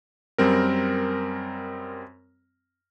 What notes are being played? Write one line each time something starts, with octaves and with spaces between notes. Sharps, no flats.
F#2 G3 C4 A#4